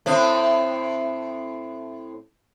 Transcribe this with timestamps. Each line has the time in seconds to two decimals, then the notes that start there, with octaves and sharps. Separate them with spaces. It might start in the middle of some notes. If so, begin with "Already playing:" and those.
0.06 A2 C4